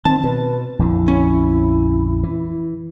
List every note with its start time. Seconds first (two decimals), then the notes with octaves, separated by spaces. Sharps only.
0.05 D#3 C4 A5
0.24 B2 B4
0.79 A#1 F2 D3 E4
1.08 C#4
2.23 E3